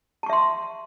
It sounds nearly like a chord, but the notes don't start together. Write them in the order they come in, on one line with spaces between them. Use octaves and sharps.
A5 C#6 E5 C6